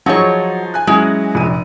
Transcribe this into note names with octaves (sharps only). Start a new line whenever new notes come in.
F3 F#3 D#4 G#4 C#5
G#5 F#6
F#3 G#3 C#4 E4
F1 A#1 D#7